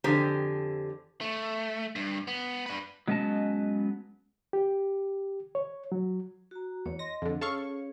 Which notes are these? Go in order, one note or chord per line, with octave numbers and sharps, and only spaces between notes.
F2 D3 G4 G#4 C5 A#5
A3
G2
B3
D4 B4
F#3 G#3 B3 C#4 D#5 A5
G4
C#5
F#3
F#4 A#5
E2 C#5
D#5 C6 A#6
F2 D3
C#4 G#4 A4 C#5 F5 C#6